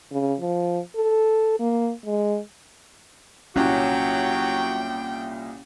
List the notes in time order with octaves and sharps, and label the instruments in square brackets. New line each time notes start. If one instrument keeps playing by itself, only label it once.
[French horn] C#3
F3
A4
A#3
G#3
[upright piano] C2 A#2 [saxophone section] F#3 F#4 [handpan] C#4 [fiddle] G5